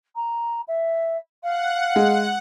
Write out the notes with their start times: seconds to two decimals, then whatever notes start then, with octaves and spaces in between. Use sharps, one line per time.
0.15 A#5
0.67 E5
1.43 F5 F#5
1.96 G#3